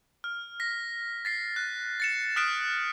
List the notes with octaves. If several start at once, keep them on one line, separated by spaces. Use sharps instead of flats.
F6
A#6 B6
A6 B6 C7
F#6
A6 C#7 E7
D#6 F6 F#6 B6 D7 E7